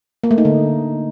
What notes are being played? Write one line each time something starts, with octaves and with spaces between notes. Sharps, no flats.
A#3
A3
D#4
D3